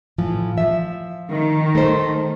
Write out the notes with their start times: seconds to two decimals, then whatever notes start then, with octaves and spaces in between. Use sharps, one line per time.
0.18 A2 E3 F3
0.58 F3 E5
1.32 D#3
1.75 A3 C5